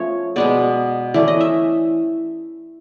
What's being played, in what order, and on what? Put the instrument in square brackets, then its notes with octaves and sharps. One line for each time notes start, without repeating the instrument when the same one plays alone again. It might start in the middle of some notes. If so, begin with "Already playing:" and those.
Already playing: [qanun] F3 A3 C#4 C#5
B2 G#3 B3 D5
E3 A3 C#4 D5
D#5
E5